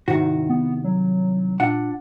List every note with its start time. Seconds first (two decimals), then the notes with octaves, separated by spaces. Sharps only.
0.08 C2 G#2 D#3 F#4
0.49 B3
0.84 F#3
1.60 A#2 D4 F#5